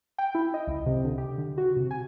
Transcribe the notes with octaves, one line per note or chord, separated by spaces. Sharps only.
G5
E4
D#5
C#2
C3
D3
G4
D3
F#4
C3
G#5